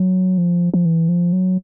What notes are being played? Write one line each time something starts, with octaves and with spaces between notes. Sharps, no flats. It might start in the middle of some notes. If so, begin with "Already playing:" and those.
Already playing: F#3
F3
F3
E3
F3
F#3